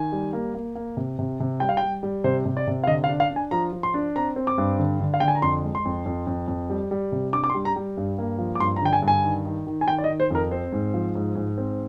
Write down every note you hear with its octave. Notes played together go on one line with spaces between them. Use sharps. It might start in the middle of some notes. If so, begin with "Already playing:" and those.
Already playing: D#3 G#5
G3
A#3
A#3
A#3
C3
C3
C3
G3 G5
F5
G5
G3
G3
C3 C5
C3
D5
C3
F5
D3 D#5
F5
D4
F5
D4
G#5
F3 A#5
F3
C6
D4
C4 A#5
C4
D6
G2
D3
D3
F5
D3 G5
G#5
A#5
F2 C6
G#3
C6
F2
F2
F2
F2
G3
G3
C3
D4 D6
D6
C6
G3
A#5
G3
G2
A#3
F3
D6
G2 C6
A#5
D3 G5
G#5
G2
G#5
D#3
D#3
D#3
G#5
D#3 G5
D5
D#5
D#3
C5
F2 A#4
C4 C5
G#2
F3
G#2
G#2
C4